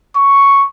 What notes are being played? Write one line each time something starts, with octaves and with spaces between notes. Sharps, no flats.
C#6